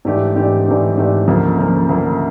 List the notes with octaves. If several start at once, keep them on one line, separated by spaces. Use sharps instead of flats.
G#2 E3 A3 D4 G4
G#2 E3 A3 D4 G4
G#2 E3 A3 D4 G4
G#2 E3 A3 D4 G4
D2 C#3 F3 A#3
D2 C#3 F3 A#3
D2 C#3 F3 A#3